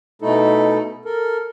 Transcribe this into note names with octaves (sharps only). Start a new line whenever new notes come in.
B2 A3 D#4 E4 A4
A4 A#4